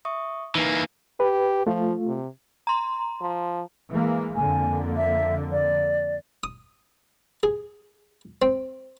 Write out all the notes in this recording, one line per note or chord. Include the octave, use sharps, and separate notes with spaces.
E5 C#6 D#6
E3 A#3 D#4 B4 G#5
G4 B4
F3 A3 F4
C3
A#5 C6
F3
E3 G#3 A#3
F2 D3 A#3 G#5
E5
D5
D#6
G#4
C4